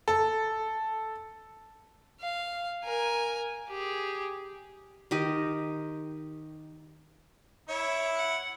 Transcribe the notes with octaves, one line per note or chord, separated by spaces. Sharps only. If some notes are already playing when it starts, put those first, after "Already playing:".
A4
F5
A#4 G#5
G4 G#4
D#3 G4 D#5
E4 C#5 E5
F#5